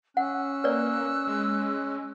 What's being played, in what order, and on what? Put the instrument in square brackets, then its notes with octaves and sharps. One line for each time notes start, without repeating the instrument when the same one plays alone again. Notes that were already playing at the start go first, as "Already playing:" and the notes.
[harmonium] C#4 [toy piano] F#5 [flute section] E6 F#6
[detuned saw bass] A#3 [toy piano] B4 C#5 D5
[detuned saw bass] G#3